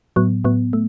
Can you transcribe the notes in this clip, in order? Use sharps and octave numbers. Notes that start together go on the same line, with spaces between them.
A2 F#3 B3
A2 F#3 B3
A3